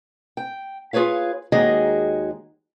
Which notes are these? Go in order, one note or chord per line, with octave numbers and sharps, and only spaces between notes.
G5
F4 G#4 B4 C#5 F5
D#2 D#3 G#3 F#4 G#4 D#5